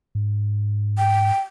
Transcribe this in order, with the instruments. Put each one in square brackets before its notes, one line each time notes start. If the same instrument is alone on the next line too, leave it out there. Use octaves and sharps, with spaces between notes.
[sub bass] G#2
[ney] G5